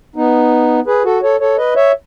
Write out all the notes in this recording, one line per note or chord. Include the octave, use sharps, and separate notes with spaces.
B3 D#4
G#4 B4
F#4 A4
A4 C#5
A4 C#5
B4 D#5
C#5 E5